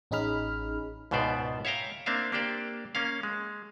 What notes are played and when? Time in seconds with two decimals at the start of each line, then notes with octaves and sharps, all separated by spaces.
0.11 A1 C#4 D#4 G#4 B5 F6
1.11 C#2 G#2 B2 B3 C5 D5
1.65 C#5 E5 F5 G5 A#5
2.06 A#3 C4 D4 E5 F5
2.32 A#3 D4 G4 C5 D5 G5
2.95 A#3 C#4 F5
3.23 G#3